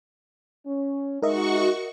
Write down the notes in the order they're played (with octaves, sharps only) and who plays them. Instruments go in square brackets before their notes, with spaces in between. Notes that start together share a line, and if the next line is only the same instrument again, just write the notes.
[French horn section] C#4
[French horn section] G#3 D#4 [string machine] F#4 C#6 [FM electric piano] A#4 D#5 E5